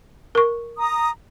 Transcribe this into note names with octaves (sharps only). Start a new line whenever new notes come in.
A#4 C#6
A#5 D#6